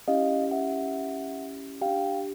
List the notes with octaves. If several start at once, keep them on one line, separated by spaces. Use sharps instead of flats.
C#4 E4 G4 D#5 F5
E5 F#5
D4 G4 F5 G5